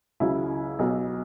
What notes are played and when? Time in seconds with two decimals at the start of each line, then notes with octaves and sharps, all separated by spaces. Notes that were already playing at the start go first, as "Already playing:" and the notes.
0.20 C#2 C#3 F#3 E4
0.79 B1 B2 F#3